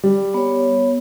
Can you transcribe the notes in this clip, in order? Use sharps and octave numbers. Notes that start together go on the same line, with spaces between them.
G3
B3 C#5